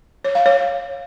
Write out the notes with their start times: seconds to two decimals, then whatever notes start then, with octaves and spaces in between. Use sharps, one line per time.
0.25 C#5
0.35 F5
0.46 C#5